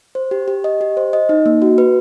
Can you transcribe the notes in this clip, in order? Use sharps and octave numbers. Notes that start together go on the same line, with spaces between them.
C5
G4
G4
D#5
G4
C5
D#5
D#4
A#3
F#4
B4